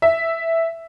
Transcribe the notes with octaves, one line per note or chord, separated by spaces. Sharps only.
E5